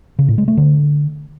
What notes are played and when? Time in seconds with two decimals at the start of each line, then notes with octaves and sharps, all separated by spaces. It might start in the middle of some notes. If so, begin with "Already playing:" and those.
0.19 C#3
0.28 A2
0.38 G#3
0.48 A3
0.57 D3